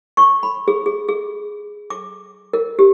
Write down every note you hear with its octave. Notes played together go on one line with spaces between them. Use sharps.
C#6
B5
G#4
G#4
G#4
D6
A#4
G4